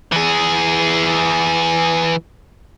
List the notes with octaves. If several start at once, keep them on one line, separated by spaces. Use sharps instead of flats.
E3 G#4